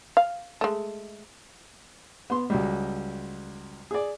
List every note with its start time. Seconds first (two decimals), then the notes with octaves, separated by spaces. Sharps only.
0.17 F5
0.61 G#3 A3
2.30 B3 C6
2.50 C#2 F#3 G3
3.91 G#4 D5